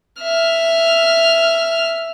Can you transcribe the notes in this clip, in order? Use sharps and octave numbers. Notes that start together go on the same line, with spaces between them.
E5 F6